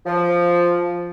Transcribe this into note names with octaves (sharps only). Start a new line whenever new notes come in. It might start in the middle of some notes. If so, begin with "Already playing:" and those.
F3